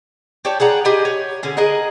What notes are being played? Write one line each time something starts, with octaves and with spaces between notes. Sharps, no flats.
G4 C#5 D5 A5
G#4 D5 F#5 A#5
G4 G#4 D#5 G#5
C#5
D3 C#4 G#4
G#4 A#4 D#5 F#5